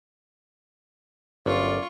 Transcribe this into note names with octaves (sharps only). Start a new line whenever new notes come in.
G1 F#2 F4 D5 C#6